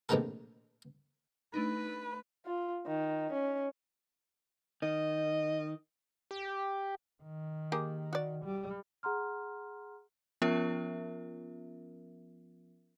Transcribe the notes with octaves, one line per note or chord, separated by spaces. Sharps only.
A#1 A2 C3 D#3 B3 A4
A3 D4 D#4 B4
F4
D#3
C#4
D#3 D#5
G4
D#3
A#3 G4 G#4
F#4 D5
G3
G#4 F#5 A#5 C6 F6
F3 B3 C#4 F4 A#4 E5